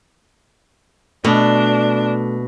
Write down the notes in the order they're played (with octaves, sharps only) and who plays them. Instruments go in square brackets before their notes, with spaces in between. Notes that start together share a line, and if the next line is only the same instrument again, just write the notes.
[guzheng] B2 [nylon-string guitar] A3 [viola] D4 [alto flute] D5